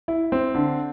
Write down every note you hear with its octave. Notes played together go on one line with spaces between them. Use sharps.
E4
C4
D3